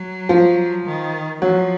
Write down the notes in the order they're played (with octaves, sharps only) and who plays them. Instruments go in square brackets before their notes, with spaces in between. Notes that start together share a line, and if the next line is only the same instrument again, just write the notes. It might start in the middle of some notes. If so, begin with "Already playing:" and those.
Already playing: [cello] F#3
[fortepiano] F3
[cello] D#3
[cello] F3 [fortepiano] F#3